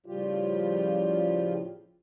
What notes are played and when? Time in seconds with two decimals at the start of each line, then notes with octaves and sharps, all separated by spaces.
0.06 A2 C#3 F3 G3 F4 G4